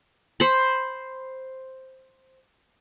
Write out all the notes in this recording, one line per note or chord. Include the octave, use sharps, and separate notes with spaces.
C5 B5